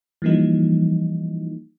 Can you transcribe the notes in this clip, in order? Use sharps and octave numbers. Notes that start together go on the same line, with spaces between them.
E3 F3 G3 A#3 D#4